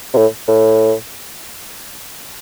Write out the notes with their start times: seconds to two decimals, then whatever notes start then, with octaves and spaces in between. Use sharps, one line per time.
0.14 C3
0.17 A2
0.48 A2